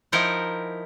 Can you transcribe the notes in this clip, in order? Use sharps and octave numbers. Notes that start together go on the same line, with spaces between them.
F3 D#4 E4 A#4 F#5 G5